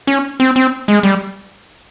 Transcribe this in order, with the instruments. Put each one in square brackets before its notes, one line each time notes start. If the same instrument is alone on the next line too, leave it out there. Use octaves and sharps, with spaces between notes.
[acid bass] C#4
C4
C4
G#3
G3